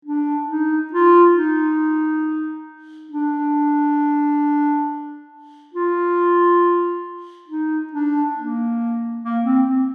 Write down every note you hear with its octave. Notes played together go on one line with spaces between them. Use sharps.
D4
D#4
F4
D#4
D4
F4
D#4
D4
A#3
A#3
C4
C4